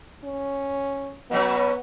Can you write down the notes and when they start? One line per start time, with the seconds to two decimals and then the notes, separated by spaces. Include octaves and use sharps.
0.25 C#4
1.31 B2 F#3 B3 C#4